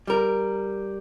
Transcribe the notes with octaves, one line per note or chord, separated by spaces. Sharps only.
G3 A#4